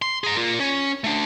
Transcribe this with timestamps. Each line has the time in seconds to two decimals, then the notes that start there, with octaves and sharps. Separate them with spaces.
0.02 C6
0.24 G#4 A#5
0.37 F4 A#4
0.60 C#4
1.04 A3 D4